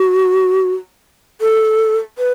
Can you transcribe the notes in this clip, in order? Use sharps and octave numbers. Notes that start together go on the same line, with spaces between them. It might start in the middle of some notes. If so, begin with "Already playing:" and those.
Already playing: F#4
A4
B4